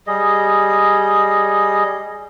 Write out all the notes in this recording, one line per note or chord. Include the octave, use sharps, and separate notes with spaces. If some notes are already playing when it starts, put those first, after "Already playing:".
G3 G#4 D#5